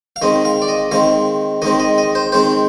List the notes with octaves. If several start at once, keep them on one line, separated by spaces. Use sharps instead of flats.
F5
D#3 G#3 C4 D#5
F5
D5
D#5
D#3 G#3 C4 F5
D#3 G#3 C4 D#5
D#5
D#5
C5
D#3 G#3 C4 C5